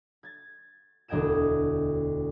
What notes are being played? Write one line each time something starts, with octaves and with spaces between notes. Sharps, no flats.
G#6 A6
E1 D2 D#5 G5 G#6 E7